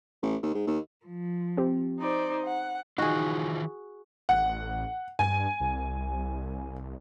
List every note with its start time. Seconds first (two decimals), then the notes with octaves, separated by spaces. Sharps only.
0.22 A1
0.43 D#2
0.54 G#2
0.67 D#2
1.06 F3
1.57 C4 G4
1.99 D#4 C5 D5
2.45 F#5
2.98 D#3 E3 D#4 F4 F#4 G#4
4.29 A1 F#5
5.19 G2 G#5
5.60 C2